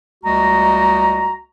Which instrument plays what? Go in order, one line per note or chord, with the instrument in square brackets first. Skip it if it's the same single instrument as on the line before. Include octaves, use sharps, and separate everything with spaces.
[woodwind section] C#2 G3 A3 F#4 D#5 A#5